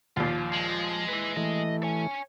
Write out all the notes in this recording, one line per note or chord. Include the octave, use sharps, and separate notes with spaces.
D#2 A#2 F3 F4
G#3
E4 B4
E3 A3 D#5
C#5 G#5